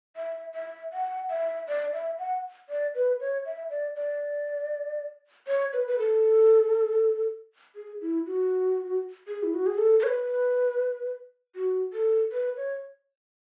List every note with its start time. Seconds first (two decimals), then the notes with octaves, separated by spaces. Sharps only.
0.16 E5
0.55 E5
0.93 F#5
1.30 E5
1.68 D5
1.93 E5
2.19 F#5
2.69 D5
2.95 B4
3.20 C#5
3.46 E5
3.70 D5
3.96 D5
5.47 C#5
5.73 B4
5.88 B4
5.99 A4
7.76 G#4
8.01 E4
8.27 F#4
9.28 G#4
9.43 E4
9.54 F#4
9.66 G#4
9.78 A4
9.99 A4
10.03 C#5
10.07 B4
11.56 F#4
11.93 A4
12.32 B4
12.57 C#5